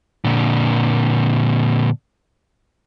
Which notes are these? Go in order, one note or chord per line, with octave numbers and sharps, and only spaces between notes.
A#2 D3